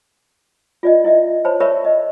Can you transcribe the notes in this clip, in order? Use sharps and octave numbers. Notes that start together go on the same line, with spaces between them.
F4 D5 D#5
E4 D#5 E5
C5 C#5 A5 B5 C6
A#4 C#5 D5 E5 B5 C#6
D#5